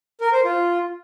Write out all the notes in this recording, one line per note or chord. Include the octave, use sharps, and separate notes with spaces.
A#4
C5
F4